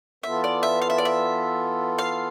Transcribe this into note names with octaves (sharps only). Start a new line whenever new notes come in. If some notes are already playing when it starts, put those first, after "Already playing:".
E3 B3 F4 A4 E5
D5
E5
F5
E5
D5
E5
F5